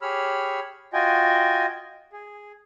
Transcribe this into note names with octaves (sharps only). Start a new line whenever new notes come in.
G4 G#4 C#5 B5 E6 F6
F4 F#4 D#5 G5 G#5
G#4